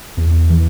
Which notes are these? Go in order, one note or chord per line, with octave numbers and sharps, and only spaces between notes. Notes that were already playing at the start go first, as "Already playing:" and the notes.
E2
E3